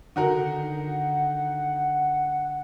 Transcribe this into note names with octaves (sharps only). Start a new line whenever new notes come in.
D3 D#3 F#4 A#4 F#5